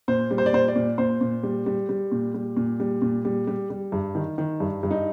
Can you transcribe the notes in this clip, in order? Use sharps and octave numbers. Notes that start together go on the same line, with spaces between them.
A#2 C5
G3
C5
D5
A#2 C5
D5
A#2
A#2 C5
A#2
G3
G3
G3
A#2
G3
A#2
G3
A#2
G3
G3
G3
G2
D#3
D#3
G2
G2
D#4